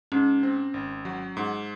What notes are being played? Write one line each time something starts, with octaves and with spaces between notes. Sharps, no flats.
G#2 C#4
C4
G#1
F#3
G#2